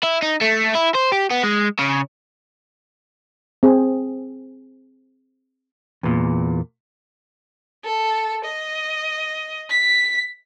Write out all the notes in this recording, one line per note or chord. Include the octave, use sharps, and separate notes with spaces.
E4
D#4
A3
E4
C5
G4
B3
G#3
C#3
C4 G#4
E2 A#2
A4
D#5
B6